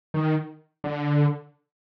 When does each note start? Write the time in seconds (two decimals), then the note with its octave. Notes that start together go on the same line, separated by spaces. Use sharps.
0.14 D#3
0.84 D3